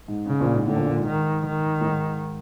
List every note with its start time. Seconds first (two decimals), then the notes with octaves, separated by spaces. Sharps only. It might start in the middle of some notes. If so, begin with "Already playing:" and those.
0.08 G#2
0.27 C#3
0.40 A#1 A#2
0.54 G#2
0.66 A2 D3
0.76 A#1 A#2
0.87 A#1 A#2
0.97 G#2
1.07 D#3
1.46 D#3
1.80 A2
1.85 G#2